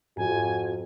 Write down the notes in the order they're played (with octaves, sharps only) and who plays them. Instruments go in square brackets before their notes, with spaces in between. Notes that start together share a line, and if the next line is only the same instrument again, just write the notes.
[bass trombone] F2 [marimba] G#2 [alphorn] F#4 [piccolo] G#5